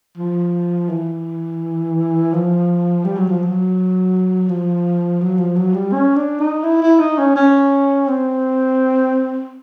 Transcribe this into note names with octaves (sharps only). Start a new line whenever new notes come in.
F3
E3
F3
G3
F#3
F3
F#3
F3
F#3
F3
F#3
G3
C#4
D4
D#4
E4
E4
D#4
C#4
C#4
C4